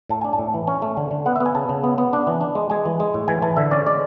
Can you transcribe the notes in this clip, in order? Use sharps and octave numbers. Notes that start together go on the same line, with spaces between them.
A2 A5
D4 G#5
A5
A2
E3
C#4 G#5
A3
D3
D3
B3 F#5
E5
B3
G#5
C#3 A5
C#3
B3
B3
D4
E3
D4
G#3
G#3 G#5
E3
G#3
A2
E3 G#5
E3 A5
D3 E5
C#4 D5
G#3 D5